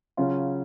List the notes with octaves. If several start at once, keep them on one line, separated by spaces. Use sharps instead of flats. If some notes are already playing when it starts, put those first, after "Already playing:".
C#3 F#3 C#4 F4